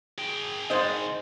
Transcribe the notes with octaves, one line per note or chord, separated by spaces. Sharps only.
G#4 G5
D#3 G#3 C5 D#5